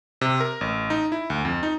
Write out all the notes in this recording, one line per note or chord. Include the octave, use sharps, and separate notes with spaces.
C3
A#4
A1
D#4
E4
D2
F2
D#4